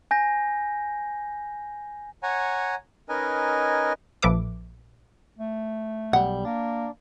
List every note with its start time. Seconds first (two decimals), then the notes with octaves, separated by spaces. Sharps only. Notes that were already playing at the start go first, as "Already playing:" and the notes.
0.11 G#5 G6 A#6
2.23 C#5 F#5 G#5 A#5
3.09 C#4 D#4 A#4 B4 D#5 G#5
4.22 A#1 F3 A4 B4 E5 D6
5.38 A3
6.13 B1 G3 F#5
6.45 A#3 D4